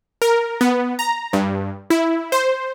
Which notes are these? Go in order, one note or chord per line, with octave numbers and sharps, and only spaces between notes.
A#4
B3
A#5
G2
E4
C5